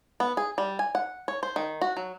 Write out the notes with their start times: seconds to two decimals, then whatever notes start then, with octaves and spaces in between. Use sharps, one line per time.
0.20 B3
0.37 G#4
0.58 G3
0.79 G#5
0.95 F#5
1.28 C#5
1.43 C5
1.56 D#3
1.81 F#4
1.97 F#3